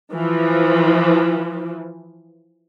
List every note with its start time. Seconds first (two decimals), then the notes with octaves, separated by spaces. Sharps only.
0.13 E3 F3